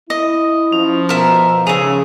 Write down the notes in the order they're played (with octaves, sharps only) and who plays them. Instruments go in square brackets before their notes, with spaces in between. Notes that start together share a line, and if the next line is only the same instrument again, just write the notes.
[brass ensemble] E4 [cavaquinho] D#5
[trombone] F3 [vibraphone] C#4
[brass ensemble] B2 [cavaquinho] A#4 E5 [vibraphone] B4 A#5
[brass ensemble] D#2 G#2 F3 [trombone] C#3 [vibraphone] C#4 [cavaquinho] G#4 E5